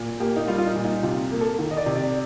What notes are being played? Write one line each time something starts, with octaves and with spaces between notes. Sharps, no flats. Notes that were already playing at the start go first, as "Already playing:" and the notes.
Already playing: A#2
A#3 G4
D#4
G3 F4
F4
D#4
A#2
D#4
C3 F4
A#3
A4
D#3
D#5
D5
C3
D5